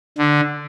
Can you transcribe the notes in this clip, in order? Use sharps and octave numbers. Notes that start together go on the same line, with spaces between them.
D3